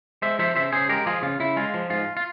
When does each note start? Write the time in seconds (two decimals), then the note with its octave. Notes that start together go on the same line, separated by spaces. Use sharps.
0.22 G#3 C5 E5
0.39 F3 C5 E5
0.56 C#3 C5 E5
0.72 C#3 G#4 C5
0.89 G#3 G4 A#4
1.06 F3 F4 G#4
1.22 C#3 F4
1.40 C#3 E4
1.57 G#3 F4
1.74 F3
1.90 G#2 F4
2.17 F4